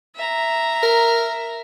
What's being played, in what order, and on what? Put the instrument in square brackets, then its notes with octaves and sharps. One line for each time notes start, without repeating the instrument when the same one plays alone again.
[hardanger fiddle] E5 A#5
[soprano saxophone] A#4